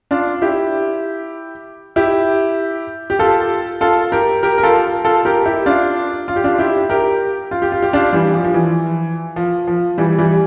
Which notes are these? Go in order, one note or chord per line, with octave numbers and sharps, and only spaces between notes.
D4 F4
E4 G4
E4 G4
G4
F4 A4
F4 A4
G4 A#4
G4 A#4
A#4
F4 A4
F4 A4
G4 A#4
E4 G4
D4 F4
F4
G4
D4 F4
E4 G4
G4 A#4
F4
G4
F4
G4
D4 F4
E3 G3
F3
F3
E3
F3
F3
E3 G3
E3 G3